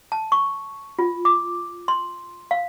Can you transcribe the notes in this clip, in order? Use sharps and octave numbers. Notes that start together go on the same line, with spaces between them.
A5
C#6
F4
D6
C6
F5